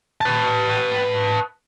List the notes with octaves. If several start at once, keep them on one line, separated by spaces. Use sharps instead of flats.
B4 A5